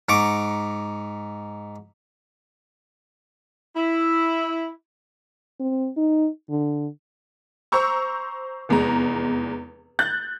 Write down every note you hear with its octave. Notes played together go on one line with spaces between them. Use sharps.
G#2 A#5 C#6 D6
E4
C4
D#4
D3
C5 A#5 C#6 E6
F1 E2 G#3 A#5
F#6 G6 A6